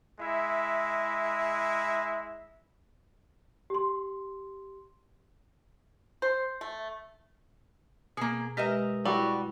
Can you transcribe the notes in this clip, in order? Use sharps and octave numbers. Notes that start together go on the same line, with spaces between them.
G#3 E4 E5
G4 C6
C5
A3
B2 A#3 G#4
G#3 G4 A#4 B4 D#5 E5
G3 E4 F#4